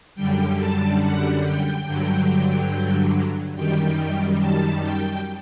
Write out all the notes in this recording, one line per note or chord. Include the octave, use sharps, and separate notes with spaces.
F#2 D3 G3 G5
A5
F#5
G5
G2 D3 F#3
F#2 D#3 G3 G5
A5
G5